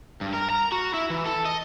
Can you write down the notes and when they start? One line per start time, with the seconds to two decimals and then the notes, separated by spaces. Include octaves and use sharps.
0.21 G2
0.33 A#4
0.50 A#5
0.72 F#4
0.94 E4
1.10 E3
1.25 A4
1.45 D#5